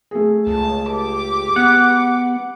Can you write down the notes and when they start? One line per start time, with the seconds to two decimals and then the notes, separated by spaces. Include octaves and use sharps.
0.11 A3 G#4
0.47 C#2 A5
0.88 G4 D6
1.56 B3 F#5